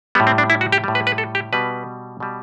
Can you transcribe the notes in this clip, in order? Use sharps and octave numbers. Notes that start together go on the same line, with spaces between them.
A2 G3 B3
C4
D4
E4
F#4
G4
A2 G3
B4
B4
A4
G4
B2 G3 B4
B2 G3